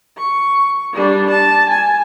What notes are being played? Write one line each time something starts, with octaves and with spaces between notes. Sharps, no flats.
C#6
G3 D4
A5
G#5